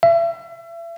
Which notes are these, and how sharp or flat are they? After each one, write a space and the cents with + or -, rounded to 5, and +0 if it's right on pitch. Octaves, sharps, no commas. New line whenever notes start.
E5 +35